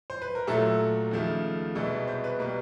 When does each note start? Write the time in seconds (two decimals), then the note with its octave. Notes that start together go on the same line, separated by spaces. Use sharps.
0.10 C5
0.22 B4
0.35 A#4
0.47 A#2 F#3 A3 A4
1.11 D#2 C#3 F3 A3
1.75 C2 B2 G#3 A4
2.07 C5
2.24 B4
2.39 B2 G3 A#3 B4